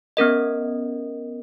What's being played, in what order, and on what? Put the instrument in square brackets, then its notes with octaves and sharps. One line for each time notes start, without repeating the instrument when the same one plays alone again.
[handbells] B3 C#4 A#4 D#5